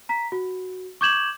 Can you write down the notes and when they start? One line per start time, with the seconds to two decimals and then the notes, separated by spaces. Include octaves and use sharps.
0.09 A#5 B6
0.32 F#4
1.01 C#6 D6 G6 G#6 E7 F#7